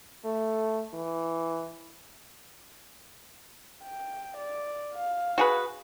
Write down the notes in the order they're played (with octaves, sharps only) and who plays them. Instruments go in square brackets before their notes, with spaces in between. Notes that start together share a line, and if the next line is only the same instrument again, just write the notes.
[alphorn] A3
E3
[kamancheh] G5
D5
F5
[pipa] F#4 G#4 B4